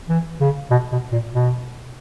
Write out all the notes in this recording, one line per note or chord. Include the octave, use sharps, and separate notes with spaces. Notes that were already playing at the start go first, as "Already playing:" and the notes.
E3
C#3
B2
B2
A#2
B2